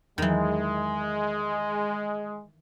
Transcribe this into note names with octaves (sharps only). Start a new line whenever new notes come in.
E2 D#3 E3 F#3 G#3